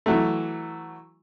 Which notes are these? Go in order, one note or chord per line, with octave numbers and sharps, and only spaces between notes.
E3 F#3 A3